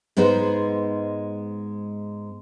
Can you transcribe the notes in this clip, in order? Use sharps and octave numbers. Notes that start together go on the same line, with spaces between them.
G#2 G#3 B3 D#4 C5